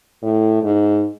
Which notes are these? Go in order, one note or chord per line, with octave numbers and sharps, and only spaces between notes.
A2
G#2